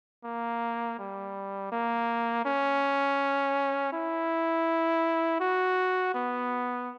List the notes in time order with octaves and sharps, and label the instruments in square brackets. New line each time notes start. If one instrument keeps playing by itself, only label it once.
[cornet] A#3
G3
A#3
C#4
E4
F#4
B3